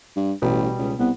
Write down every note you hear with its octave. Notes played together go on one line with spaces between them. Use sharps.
G2
A1 B2 G3
C#2
C2 B3